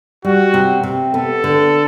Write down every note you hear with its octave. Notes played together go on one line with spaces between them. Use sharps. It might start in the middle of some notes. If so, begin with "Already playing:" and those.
G3 F#4
C3
C3
B3 A4
D3